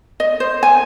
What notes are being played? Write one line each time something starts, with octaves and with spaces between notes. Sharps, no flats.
D#5
C5
G#5